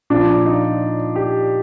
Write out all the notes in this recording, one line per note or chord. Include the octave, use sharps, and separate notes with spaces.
A#2 F3 D4
D#4
G4